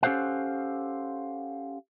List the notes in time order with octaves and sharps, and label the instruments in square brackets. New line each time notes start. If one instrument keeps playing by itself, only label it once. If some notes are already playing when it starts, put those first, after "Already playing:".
[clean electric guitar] C#4 G4 A4 C5 F5 F#5